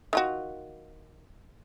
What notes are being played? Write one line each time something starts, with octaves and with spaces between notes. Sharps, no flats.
D#3 F4 F#4